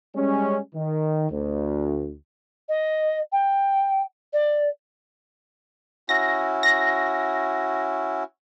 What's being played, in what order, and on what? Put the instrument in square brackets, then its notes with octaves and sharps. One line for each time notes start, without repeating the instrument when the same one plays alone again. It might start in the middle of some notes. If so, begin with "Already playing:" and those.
[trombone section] G3 G#3 C#4
D#3
D2
[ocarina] D#5
G5
D5
[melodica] C#4 E4 F#4 [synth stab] A#6
[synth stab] A#6